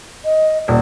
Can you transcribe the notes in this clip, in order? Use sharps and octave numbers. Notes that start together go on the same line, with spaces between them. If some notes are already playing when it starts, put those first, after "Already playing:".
D#5
D#1 D5